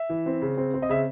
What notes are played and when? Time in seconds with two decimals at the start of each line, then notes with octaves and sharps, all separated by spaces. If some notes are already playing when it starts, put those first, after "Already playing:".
Already playing: E5
0.09 E3
0.26 C4
0.42 C#3
0.58 C4
0.74 C4
0.82 D#5
0.89 C#3 E5